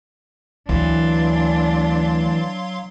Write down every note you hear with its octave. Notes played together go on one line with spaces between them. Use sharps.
D2 E3 F#3 D4 F5 C6